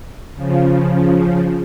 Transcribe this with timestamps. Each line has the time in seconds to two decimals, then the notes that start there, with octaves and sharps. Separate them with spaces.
0.36 C#3 F3